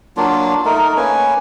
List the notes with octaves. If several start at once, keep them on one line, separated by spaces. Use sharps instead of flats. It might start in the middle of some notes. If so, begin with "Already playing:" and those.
F#3 A#3 D4 F4
A3 D#4 A#4
A#3 C#4 B4 G#5